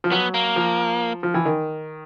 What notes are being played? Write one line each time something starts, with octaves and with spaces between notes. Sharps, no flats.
F3
F#3 B3
A#3
F3
F3
E3
D#3